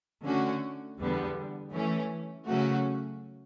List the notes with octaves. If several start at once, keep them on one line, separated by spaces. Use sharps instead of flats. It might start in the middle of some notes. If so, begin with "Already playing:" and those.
D3 A3 C#4 F#4
E2 D3 G3 B3
E3 A3 C#4
C#3 F#3 A3 C#4 F#4